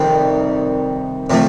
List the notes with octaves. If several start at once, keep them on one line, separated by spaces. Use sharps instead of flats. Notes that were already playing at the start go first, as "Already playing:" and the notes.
Already playing: F2 C3 D#3 G3 C4
C3 F3 A3